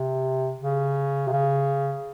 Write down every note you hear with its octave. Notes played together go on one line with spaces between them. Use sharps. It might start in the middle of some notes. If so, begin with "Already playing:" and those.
Already playing: C3
C#3
C3
C#3